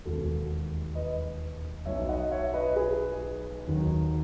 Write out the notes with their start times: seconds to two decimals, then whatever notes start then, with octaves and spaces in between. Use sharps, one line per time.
0.05 E1 D#2 D#3 G#3 B3 F#4 A4
0.95 B4 D#5
1.86 B1 B2 F#3 C#5 E5
2.09 D#5 F#5
2.31 C#5 E5
2.54 B4 D#5
2.76 G#4 B4
3.67 D#2 D#3 F#3